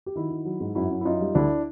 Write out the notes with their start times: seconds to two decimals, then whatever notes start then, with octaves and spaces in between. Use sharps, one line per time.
0.06 G4
0.15 D#3 E4 F#4
0.31 D#3
0.45 F#3
0.60 G#2
0.75 F#2 E4 F#4
0.90 F#2
1.01 E4
1.05 F#2 D#4 F4
1.21 G3
1.35 D2 D4 E4